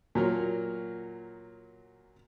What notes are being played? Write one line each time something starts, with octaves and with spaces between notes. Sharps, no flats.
A#2 F#3 A#4